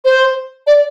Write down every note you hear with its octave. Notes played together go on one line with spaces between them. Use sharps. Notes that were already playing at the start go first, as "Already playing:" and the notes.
C5
D5